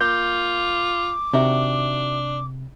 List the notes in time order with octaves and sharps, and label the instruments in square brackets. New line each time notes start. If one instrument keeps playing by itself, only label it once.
[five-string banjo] A#3 [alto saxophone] F4 [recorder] D6 [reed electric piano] G6
[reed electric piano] C3 [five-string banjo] D#3 F#4 E5 [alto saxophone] D4